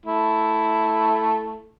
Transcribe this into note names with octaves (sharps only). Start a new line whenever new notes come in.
A3 E4